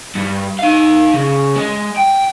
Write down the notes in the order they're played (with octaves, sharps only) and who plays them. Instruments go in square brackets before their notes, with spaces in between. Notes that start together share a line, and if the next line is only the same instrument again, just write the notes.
[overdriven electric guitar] G2
D#4 F5
C#3
G#3
G5